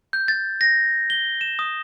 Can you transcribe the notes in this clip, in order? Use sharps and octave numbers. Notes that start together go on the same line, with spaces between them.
G6
A6
A#6
G7
E7
D#6